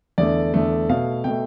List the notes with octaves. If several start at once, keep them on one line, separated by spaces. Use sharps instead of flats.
E2 D3 A3 D5
E2 D3 A3
B2 A3 F5
B2 A3 G5